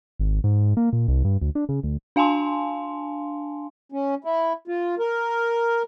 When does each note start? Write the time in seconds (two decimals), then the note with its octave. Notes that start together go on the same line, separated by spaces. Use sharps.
0.19 G#1
0.44 G#2
0.77 A#3
0.93 A#2
1.08 C2
1.25 G2
1.42 D2
1.55 D4
1.69 C#3
1.83 D2
2.16 D4 F5 G#5 A5 C6
3.92 C#4
4.24 E4
4.68 F4
4.99 A#4